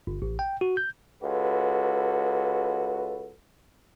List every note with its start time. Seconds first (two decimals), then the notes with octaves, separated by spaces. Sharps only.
0.07 G1
0.22 A1
0.39 G5
0.61 F#4
0.77 G6
1.23 C#2 F#4 A4 B4